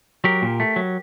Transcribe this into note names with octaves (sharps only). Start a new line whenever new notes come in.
F#3 G4 A#4
A#2
A3
F#3